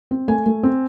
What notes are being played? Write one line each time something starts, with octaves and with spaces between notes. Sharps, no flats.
C4
A3 G#5
A3
C4